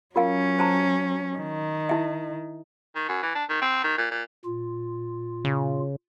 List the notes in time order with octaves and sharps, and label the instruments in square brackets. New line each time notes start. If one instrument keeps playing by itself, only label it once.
[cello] F#3 C#4 [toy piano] F4 A#4 F5
[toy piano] C5 A5 A#5
[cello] D#3
[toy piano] E4 E5
[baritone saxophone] D#3
F#2
E3
D4
D#3
C4
D#3
A#2
A#2
[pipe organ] A#2 F4
[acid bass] C#3